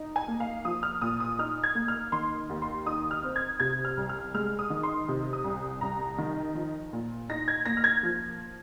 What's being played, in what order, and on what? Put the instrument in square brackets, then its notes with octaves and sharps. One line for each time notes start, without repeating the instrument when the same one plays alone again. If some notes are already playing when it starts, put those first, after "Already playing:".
Already playing: [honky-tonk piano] D#4
G#5
A#3
F5
F3 D#6
F6
A#2 D#6
D#6
D#4 F6
G#6
A#3
F6
D#3 C6
D#2
C6
D#4 D#6
F6
C4
G#6
C3 G#6
F6
C2
F6
G#3 F6
D#6
D#3
C6
C3
D#6
C2
C2 A#5
D#3
F3
A#2
D#4 A#6
G#6
A#3 A#6
F6
G#6
F3